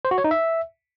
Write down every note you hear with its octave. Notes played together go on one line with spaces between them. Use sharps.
C5
F#4
C#5
D#4
E5